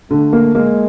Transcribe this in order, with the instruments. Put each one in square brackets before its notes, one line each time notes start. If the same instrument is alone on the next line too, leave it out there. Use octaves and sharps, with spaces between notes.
[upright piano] D3 [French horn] A3
[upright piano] A#3
[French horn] G#3 [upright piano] A#3